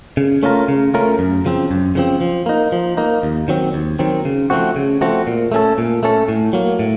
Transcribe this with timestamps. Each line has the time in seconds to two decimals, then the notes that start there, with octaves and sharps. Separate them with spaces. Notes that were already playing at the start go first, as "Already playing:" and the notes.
0.17 C#3
0.43 A3 C#4 F4 A#4
0.68 C#3
0.94 A3 C#4 F4 A#4
1.19 F#2
1.45 C#3 F3 C4
1.71 F#2
1.95 C#3 F3 C4
2.21 F3
2.46 A#3 D#4
2.72 F3
2.97 A#3 D#4
3.23 D#2
3.48 D#3 F#3 C4
3.74 D#2
3.99 D#3 F#3 C4
4.25 C#3
4.50 F3 A3 C4 F#4
4.76 C#3
5.01 F3 A3 C4 F#4
5.27 A#2
5.52 A3 C#4 A4
5.78 A#2
6.03 A3 C#4 A4
6.28 A2
6.53 F#3 A#3
6.79 A2